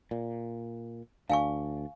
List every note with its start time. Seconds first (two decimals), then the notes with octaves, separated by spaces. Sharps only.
0.11 A#2
1.30 D2 D4 F5 G#5 C#6